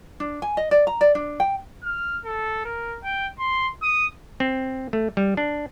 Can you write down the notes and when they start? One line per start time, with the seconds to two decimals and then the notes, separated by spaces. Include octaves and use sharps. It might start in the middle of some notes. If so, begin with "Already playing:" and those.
0.20 D4
0.42 G#5
0.57 D#5
0.71 D5
0.87 A#5
1.01 D5
1.15 D4
1.40 G5
1.84 F6
2.25 A4
2.65 A#4
3.03 G5
3.39 C6
3.82 D#6
4.40 C4
4.93 A3
5.17 G3
5.37 D4